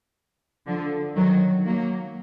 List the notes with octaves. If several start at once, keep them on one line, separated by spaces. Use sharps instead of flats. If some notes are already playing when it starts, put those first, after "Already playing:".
D3 F3
D#3 F#3
F#3 A#3